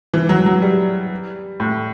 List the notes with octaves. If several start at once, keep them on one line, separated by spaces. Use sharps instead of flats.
E3
F#3
F#3
G3
A2